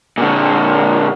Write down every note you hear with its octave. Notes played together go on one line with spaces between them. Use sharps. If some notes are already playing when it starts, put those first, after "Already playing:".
A#2 D3